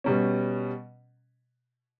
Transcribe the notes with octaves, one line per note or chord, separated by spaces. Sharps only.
B2 G3 C#4